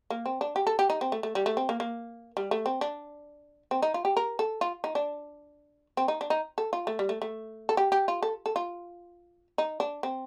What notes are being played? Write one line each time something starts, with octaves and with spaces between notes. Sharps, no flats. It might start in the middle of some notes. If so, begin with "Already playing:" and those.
A#3
C4
D4
G4
A4
G4
D#4
C4
A3
A3
G3
A3
C4
A#3
A#3
G3
A3
C4
D4
C4
D#4
F4
G4
A#4
A4
F4
D#4
D4
C4
D#4
D4
D#4
A4
F4
A3
G3
A3
A3
A4
G4
G4
F4
A4
A4
F4
D#4
D4
C4